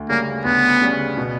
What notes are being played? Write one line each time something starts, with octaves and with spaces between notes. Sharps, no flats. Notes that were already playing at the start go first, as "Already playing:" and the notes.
Already playing: D2
C#3 G3 A#3 C#4
D2 B3
C#3 G3 C#4
B2